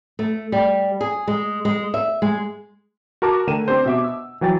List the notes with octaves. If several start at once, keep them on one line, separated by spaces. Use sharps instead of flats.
A3
G3
G#4
G#3
G#3
E5
G#3
F#4 A#4 A5 D6
D3 A3 A#4 G5 D#7 E7
C4 D4 G4 C5
B2 E5 D6
E6
E3 F#3 G5 A6